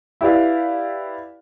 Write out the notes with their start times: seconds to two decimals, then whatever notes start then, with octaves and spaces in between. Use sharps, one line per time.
0.21 E4 G4 B4 D5 F5